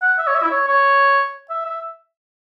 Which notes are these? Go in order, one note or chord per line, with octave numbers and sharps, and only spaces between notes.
F#5
E5
C#5
E5
E4
C#5
C#5
E5
E5